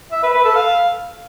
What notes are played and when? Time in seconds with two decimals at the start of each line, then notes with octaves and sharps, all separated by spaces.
0.12 E5
0.23 B4
0.34 B4
0.44 A4
0.55 F5